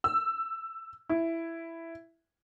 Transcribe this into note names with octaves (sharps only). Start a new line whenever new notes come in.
E6
E4